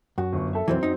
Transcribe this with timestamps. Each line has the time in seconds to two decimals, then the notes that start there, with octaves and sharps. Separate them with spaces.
0.18 F#2 F#4
0.33 G1 C#6
0.53 A4 E5
0.68 B1 F2 E3 F#3 C4
0.83 F#2 D#4